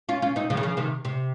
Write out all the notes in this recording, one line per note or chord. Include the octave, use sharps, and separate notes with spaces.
C#4 F4
C#4 F4
C4 D#4
C#3 F3
D#3
C#3 F3
C3 D#3
C3